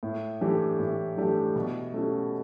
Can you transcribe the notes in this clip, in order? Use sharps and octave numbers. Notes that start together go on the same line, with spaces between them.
A2
E3 A3 D4 G4
A2
E3 A3 D4 G4
B2
A3 C#4 E4 G4